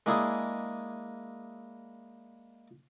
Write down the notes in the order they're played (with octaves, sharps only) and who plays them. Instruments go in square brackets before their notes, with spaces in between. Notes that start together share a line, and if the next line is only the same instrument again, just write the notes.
[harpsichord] G#3 A#3 D4 E4 G#4